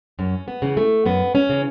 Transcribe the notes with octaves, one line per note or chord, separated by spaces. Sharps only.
F#2 C#4
B3
C#3 E3
A3
F#2 B3
C#4
C#3 E3